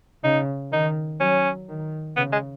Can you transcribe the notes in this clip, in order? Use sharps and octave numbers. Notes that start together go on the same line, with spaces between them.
C#3 D#4
D#3 D#4
F#3 C#4
D#3
C#3 B3
G#3